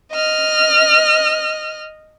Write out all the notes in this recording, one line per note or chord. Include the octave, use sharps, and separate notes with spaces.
D#5 F6